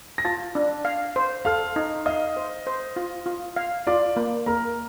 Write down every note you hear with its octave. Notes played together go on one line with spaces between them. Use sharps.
A#6
F4 A5 A6
D4
F5
C5
A4 F5 F6
D#4
D#5 F5 D#6
C5
C5
F4
F4
F5
F4 D5 D6
A#3
A#3 A#4 A#5